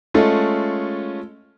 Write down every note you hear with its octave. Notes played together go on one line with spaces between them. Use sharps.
G#3 A3 C#4 F4 A4